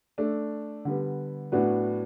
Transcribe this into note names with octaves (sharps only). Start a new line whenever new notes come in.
A3 D4 A4
D3 G3 B3
A2 F#3 B3 D4 F#4